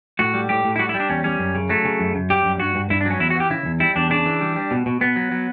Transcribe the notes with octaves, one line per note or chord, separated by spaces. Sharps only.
A2 F#4
G3
A2 G4
A2
E4
G3 F#4
E4
G3
D4
E2 C#4
G3 C#4
F#2
C#3
F#3 A3
C#3
F#2
F#2
G3 G4
F#2
G2 F#4
G2
G2 E4
D4
F#3
C#4
E2 E4
F#4
E3
G4
C#3 E4
E2
G3 E4
E2 D4
C#3 D4
E3
G3
G3
B2
B2
B2 B3
F#3
F#3